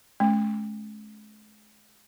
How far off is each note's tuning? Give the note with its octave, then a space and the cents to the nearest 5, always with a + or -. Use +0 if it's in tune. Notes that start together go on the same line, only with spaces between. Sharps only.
G#3 +45 C#4 +0